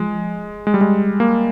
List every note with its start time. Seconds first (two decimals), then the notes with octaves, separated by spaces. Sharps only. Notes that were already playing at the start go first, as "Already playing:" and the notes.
Already playing: F3 G#3
0.67 G#3
0.74 G3
0.81 G#3
1.20 A#3